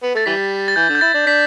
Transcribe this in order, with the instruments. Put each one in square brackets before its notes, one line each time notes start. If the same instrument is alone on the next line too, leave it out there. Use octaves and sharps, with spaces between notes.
[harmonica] B3
[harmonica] A3 [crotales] A6
[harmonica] E3 G3 [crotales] B6
[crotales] A6
[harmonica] E3 [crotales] G6
[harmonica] D3
[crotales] G6
[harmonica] E4 [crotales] A6
[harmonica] D4
[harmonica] D4 [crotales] B6